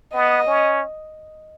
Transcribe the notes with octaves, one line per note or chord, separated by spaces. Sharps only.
B3 D#5
C#4